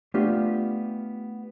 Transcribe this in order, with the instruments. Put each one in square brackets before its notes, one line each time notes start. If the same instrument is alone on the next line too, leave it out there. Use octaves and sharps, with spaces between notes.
[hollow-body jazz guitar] A3 B3 D4 F4 G4